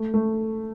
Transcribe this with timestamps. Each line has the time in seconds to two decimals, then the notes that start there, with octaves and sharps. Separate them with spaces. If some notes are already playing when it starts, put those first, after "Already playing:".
Already playing: A3
0.14 A3